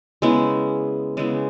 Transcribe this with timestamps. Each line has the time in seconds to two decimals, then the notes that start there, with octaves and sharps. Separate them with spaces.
0.22 C#3 G#3 B3 E4
1.17 C#3 G#3 B3 E4